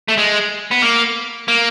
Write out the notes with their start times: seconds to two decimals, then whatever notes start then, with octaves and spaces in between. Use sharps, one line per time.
0.08 A3
0.18 G#3
0.71 B3
0.82 A#3
1.48 A#3